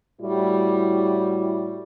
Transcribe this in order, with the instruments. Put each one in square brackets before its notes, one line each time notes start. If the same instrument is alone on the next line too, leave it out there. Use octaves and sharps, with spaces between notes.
[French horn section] A2 G3 E4 F#4